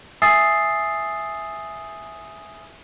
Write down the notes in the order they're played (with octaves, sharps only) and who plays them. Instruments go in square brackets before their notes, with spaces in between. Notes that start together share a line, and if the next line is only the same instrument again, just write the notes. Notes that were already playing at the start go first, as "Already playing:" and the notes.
[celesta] E5 G#5 D#6 E6 A6 C7